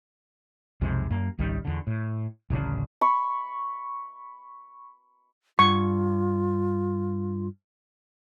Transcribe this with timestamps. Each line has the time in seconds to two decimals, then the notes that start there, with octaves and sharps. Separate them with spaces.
0.81 B1 F2 C3 G#3
1.11 F#2 A#3
1.39 G#1 C#2 D#3 G3
1.65 E2 D3
1.87 A2
2.50 D1 A1 C#3 D4
3.01 B5 C#6
5.59 G2 F4 C#6